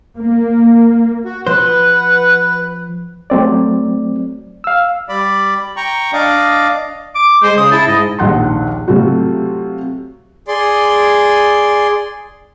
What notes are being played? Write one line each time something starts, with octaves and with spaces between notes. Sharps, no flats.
A#3
F#4
F3 B4 C5 F#5
F#3 A3 C4 D5
F5 E6
G3 D5 B5
G5 A#5 C#6
D4 D5 D#5 F5 D6
D6
G#3 C5
C#3 D#6
E4 A5
G#2 D#5
A#1 D#2 F#5 C6
C3 F#3 A3 F4 F#4
G#4 D5 C6